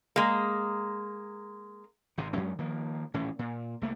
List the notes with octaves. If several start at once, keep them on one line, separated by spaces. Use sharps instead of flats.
G#3 A#3
G#1 C3
F#2 F#3 G#3 C#4
D#3 F3 A#3
D#1 A2 E3 C#4
A#2
C2 A3 A#3